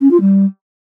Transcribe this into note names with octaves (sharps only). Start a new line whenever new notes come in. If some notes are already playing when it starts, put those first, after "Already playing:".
C#4
F4
G3